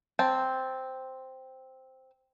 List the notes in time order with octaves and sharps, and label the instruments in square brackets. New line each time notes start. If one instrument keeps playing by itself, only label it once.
[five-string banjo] C4 A5